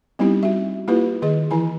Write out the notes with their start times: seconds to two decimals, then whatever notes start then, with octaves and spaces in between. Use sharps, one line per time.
0.19 G3 B3 C4 D#4 E4 G4
0.43 F#4 E5
0.88 A#3 E4 F4 G4 B4
1.22 D#3 G#4 D#5
1.51 E3 E4 G#5